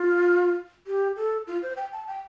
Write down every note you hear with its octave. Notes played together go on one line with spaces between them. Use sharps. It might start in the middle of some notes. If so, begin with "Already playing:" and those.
Already playing: F4
G4
A4
F4
C5
G5
A5
G5